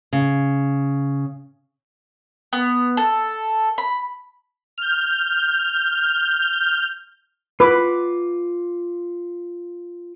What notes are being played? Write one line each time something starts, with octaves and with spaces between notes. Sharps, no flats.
C#3
B3
A4
B5
F6 G6
F4 B4 D6